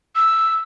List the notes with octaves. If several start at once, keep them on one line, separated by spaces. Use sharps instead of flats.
E6